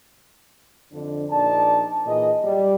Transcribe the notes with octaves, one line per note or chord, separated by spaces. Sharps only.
F2 D3 D4
A#1 D4 D#4 D5 A5
A#2 E3 D#4 G#4 D#5
G3